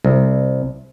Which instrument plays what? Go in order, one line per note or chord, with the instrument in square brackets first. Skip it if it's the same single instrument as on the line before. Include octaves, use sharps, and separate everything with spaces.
[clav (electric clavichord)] C2